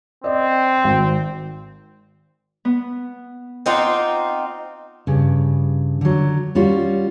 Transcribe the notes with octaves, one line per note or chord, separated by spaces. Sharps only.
C4 D5 D#5
G#1
B3
C4 D#4 F4 C5 F#5 D6
G2 C#3
D3 F#3
G3 C#4 F4 F#4